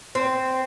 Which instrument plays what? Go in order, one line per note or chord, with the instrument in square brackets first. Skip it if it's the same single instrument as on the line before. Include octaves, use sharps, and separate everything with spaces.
[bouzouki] C4